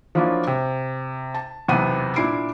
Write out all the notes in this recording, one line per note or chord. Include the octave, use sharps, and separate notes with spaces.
F3 F#3 A#3 D4 E4 F4
C3
A5
B1 E2 C3 B3 F#5 D#7
A#2 D4 E4 C7 D7